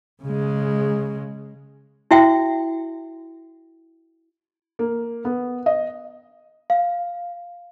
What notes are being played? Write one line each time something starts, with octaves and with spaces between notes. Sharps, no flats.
C#3 G#3
E4 F#4 E5 G5
A#3
B3
D#5
F5